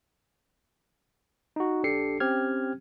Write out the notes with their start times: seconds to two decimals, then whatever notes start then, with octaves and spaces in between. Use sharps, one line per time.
1.56 D#4 F#4
1.83 A#1 D4 G4 A4 C7 C#7
2.20 C4 C#4 G4 F6 G#6